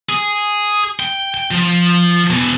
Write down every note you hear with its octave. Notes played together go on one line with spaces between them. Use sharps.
G#4
G5
G5
F3
B2 E3